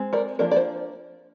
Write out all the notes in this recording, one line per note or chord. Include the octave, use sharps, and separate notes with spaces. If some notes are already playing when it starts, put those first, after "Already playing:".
Already playing: G#3 C4
A#4 D5
F3 A#3 D4 A#4 D5
D5
C5